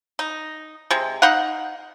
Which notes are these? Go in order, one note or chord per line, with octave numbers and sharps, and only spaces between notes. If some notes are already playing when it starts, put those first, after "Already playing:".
D#4
C3 G#3
D#4 F5 F#5